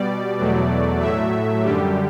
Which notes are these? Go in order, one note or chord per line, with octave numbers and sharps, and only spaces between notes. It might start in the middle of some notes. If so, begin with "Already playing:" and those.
Already playing: B2 G3 D5
E2 B2 F#3 A3
A2 F#3 A3 E5
F#2 D3 G3 G4